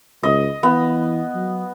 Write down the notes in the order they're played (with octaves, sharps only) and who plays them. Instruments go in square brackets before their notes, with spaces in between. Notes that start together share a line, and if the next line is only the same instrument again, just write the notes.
[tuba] C#2 [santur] D#5
[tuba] E3 [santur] B3
[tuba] F#3